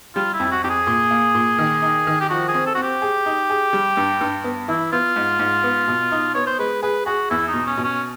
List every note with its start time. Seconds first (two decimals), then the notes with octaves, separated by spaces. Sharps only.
0.15 G3 F4
0.34 E4
0.40 F2
0.52 F#4
0.64 F2 G4
0.70 G#4
0.87 A#2
1.11 A#3
1.35 A#2
1.58 D#3
1.82 D#4
2.07 D#3
2.21 G4
2.30 F3 F#4
2.48 G#4
2.54 C4
2.66 A4
2.75 C4 F#4
2.83 G4
3.02 G#4
3.26 D#4
3.50 G#4
3.73 G3
3.97 G2
4.21 G2
4.44 B3
4.68 E3 E4
4.92 B3 F4
5.16 G#2
5.39 G#2
5.63 B3
5.88 B2
6.12 D#4
6.34 B3 C#5
6.47 C5
6.59 G#3 B4
6.83 G#4 B4
7.06 F#4 G#4
7.31 E2 E4
7.48 D#4
7.54 B2
7.67 C#4
7.77 B2
7.84 C#4